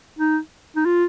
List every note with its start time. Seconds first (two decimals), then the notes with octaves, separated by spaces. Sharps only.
0.18 D#4
0.76 D#4
0.85 F4